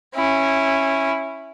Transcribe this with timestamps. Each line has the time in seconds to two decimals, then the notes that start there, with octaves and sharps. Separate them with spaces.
0.15 C#4 E4